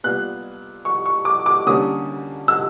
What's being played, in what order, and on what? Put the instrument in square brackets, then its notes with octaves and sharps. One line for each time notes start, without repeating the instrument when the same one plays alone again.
[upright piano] A#2 G3 B3 F#6
C#6
C#6
D6
D6
D3 G3 A#3 C#4 D#6
E6